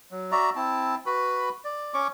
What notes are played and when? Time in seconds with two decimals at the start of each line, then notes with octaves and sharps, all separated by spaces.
0.11 F#3
0.32 F#4 D5 E5 A#5
0.56 C4 E4 A5
1.06 F#4 B4 B5
1.65 D5
1.94 C#4 C#5 C#6 D6